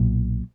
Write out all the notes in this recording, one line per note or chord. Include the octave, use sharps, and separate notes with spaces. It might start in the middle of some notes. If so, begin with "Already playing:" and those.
Already playing: B1 A#2 F#3